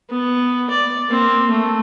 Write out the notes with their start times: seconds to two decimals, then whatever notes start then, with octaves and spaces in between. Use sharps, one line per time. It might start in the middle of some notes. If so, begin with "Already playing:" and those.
0.10 B3
0.71 D5
1.09 A#3 C4
1.49 A3